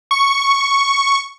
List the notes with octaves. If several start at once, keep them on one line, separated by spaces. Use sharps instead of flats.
C#6